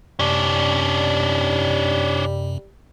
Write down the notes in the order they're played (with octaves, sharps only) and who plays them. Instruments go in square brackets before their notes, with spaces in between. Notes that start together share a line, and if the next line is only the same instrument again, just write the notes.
[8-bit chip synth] F#2 C3 [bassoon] G3 [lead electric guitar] C#4 D4